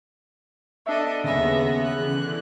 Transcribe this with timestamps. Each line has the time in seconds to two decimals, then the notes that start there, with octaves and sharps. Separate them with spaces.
0.86 B3 D4 A4 D#5 E5
1.24 D#2 C#3 E5 A#6
1.84 D3 E3 F#6